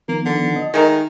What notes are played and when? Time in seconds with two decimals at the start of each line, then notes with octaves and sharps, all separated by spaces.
0.08 D#3 F3 A#3 B3
0.25 D3
0.56 D#5
0.74 D#3 G#3 A3 A#4